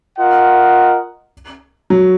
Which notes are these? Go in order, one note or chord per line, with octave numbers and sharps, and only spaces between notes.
F4 A#4 D#5 F#5
F#3